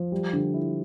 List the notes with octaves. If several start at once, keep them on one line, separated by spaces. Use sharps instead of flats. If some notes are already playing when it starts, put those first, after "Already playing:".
Already playing: F3
G3
D3
E4